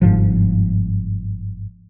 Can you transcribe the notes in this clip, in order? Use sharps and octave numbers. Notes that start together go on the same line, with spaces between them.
G1 C2 G#2 F3